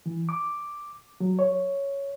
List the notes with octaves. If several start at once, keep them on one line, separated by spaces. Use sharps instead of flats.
E3
D6
F#3
C#5